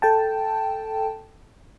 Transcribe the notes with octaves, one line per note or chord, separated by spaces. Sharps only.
A4 G5 A5